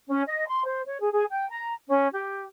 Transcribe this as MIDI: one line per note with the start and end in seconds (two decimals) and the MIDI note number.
0.08 0.22 61
0.27 0.47 75
0.47 0.64 84
0.65 0.82 72
0.86 0.97 73
1.00 1.10 68
1.12 1.24 68
1.30 1.49 79
1.49 1.73 82
1.89 2.07 61
2.12 2.44 67